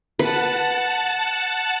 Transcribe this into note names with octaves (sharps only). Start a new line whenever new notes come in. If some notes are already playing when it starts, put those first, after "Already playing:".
B4 F#5 A5